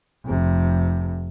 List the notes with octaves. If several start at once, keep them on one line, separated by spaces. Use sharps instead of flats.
F1 C3